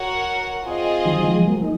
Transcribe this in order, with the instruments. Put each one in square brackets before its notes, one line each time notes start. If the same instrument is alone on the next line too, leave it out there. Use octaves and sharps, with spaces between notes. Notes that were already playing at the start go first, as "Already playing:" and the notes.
Already playing: [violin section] F#4 A#4 C#5 F#5
C4 F4 G#4 D#5
[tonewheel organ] D#3 F#3
F3 G#3
F#3 A#3
D#4